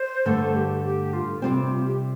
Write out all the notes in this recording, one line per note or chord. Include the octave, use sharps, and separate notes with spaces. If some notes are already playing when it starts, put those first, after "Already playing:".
Already playing: C5
G2 D3 A3 A4
G4
G4
F4
C3 G3 C4 F4
F4
F4
G4